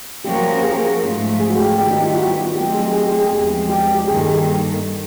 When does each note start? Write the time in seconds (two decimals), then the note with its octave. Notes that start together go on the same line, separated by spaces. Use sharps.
0.25 F3 A#3 C#4 F#4 G4 A#4
0.63 G#4
1.02 G#2 F3 A3
1.40 G#4
1.50 F#4
1.59 G4
1.78 D#3 G3 B3 E4 G4
1.91 D#4
2.04 F4
2.16 F#4
2.54 F#3 A3 C4 D#4 G4
2.73 G#4
2.93 G#4
3.06 G4
3.19 G#4
3.32 E2 C3 F3 G#3
3.70 G4
3.95 G4
4.08 G2 D#3 G3 A#3 G#4
4.21 A4
4.33 A4